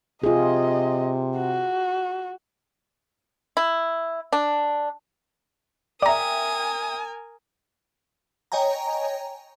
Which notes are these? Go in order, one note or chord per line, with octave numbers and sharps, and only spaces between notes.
C3 F4 G#4 D#5
F#4
E4
D4
A#4 D5 E5 G5 G#5 A#5 D#6
C#5 D#5 G5 G#5 A#5